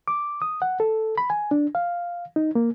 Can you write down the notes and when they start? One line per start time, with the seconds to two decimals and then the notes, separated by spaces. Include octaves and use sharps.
0.08 D6
0.42 D#6
0.62 F#5
0.80 A4
1.18 B5
1.30 G#5
1.51 D4
1.75 F5
2.36 D#4
2.55 A#3